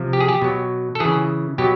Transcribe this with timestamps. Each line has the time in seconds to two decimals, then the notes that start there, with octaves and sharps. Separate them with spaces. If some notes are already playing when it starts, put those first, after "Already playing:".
Already playing: C3 F3
0.13 G4
0.20 G#4
0.28 G4
0.42 B2 F#3
0.95 A4
1.00 C#3 E3 G#4
1.58 B2 F#3 G4